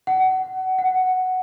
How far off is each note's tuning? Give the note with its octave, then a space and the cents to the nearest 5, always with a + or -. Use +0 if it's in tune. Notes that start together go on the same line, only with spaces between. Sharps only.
F#5 +25
F#5 +5